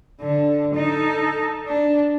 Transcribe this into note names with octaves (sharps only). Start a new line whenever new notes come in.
D3
D#4 A4
D4